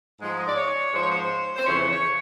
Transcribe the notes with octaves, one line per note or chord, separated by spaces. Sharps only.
G#2 F3 G#3
D#5
D5
C#5
G#2 F3 G#3 C5
C#5
C5
C5
F2 C#3 E3 C#5
C#5